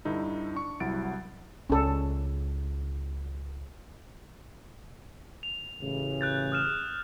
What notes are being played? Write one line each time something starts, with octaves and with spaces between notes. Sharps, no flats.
G2 D3 D#4 E4
D4 C#6
C2 F#3 E4 F#5 A6 D7
C#2 C#4 A4
F7
A1 C#3
F#6 G6 A6
D#6 F6 E7